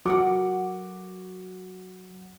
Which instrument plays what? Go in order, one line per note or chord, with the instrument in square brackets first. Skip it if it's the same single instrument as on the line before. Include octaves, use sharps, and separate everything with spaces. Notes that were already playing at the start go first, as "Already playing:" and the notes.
[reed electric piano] F#3 [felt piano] F#4 D6 [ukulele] A4 A#4 F#5